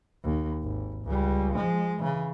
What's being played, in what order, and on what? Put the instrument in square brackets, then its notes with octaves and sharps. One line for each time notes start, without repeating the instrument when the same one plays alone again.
[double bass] D#2
G#1
C#2 G3
F3 G#3
C#3 E3